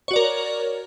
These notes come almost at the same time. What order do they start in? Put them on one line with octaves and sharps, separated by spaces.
C#5 F#4 D5 A#4